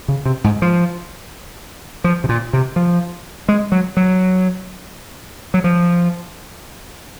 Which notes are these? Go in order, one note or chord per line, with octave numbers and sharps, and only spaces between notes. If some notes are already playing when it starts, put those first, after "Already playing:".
C#3
C3
G#2
F3
F3
C3
A#2
C3
F3
G#3
F#3
F#3
F#3
F3